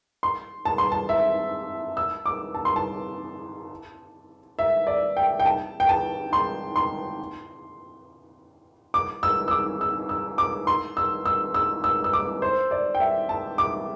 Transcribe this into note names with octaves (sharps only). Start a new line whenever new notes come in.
C6
A5
C6
A5
E5
E6
D6
A5
C6
A5
E5
D5
G5
G5
A5
G5
A5
C6
C6
D6
E6
E6
D6
E6
E6
D6
C6
E6
E6
E6
E6
E6
D6
C5
D5
G5
E5
A5
D6